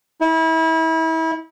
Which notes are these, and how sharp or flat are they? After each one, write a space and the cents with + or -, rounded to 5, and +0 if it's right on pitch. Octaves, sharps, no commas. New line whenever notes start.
E4 -30